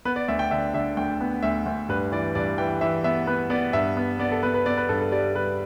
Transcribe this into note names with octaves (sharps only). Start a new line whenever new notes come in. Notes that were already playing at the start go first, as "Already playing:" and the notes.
B3 B4
D5
D2 E5
G5
D3 E5
D3 E5
D2 G5
B3
D2 E5
D2
G2 B4
E3 D5
G2 D5
E3 G5
E3 E5
B3 E5
B3 B4
B3 D5
G2 E5
B3
B3 D5
A4
B3 B4
B4
B3 D5
B4
G2 A4
A4
G3 D5
G3 B4